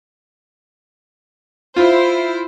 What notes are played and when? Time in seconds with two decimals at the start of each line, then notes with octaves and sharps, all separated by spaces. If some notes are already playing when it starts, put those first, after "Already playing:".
1.76 E4 F4 C5